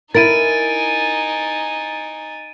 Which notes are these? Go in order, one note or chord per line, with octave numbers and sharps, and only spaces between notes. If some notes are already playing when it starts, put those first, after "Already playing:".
D#4 E4 A#4 G#5 A6 D7 D#7